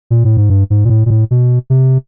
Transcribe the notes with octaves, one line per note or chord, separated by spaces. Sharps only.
A#2
A2
G#2
G2
G#2
A#2
A2
A#2
A2
B2
C3